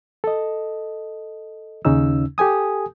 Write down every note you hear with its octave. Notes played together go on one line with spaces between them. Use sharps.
A4 D#5
D#2 C#3 C#4 D#4 E6
G4 A4 G#5 D#6